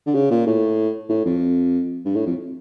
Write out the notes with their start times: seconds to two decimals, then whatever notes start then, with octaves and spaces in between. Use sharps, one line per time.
0.06 D3
0.15 C#3
0.31 A#2
0.46 A2
1.09 A2
1.25 F2
2.05 G2
2.15 A2
2.27 F2